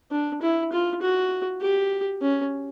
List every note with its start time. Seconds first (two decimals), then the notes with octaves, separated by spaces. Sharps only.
0.11 D4
0.42 E4
0.72 F4
1.02 F#4
1.61 G4
2.22 C#4